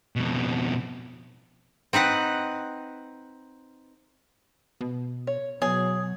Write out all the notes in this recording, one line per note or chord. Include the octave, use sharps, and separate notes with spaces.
F2 B2
C4 D#4 B4 F#5
B2
C#5
B2 F#3 G#4 C#5